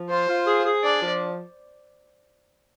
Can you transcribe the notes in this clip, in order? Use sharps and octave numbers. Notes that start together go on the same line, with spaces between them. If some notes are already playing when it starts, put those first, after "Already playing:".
Already playing: F3
F4 C5
F4
G#4
G#4
D4 D5
F3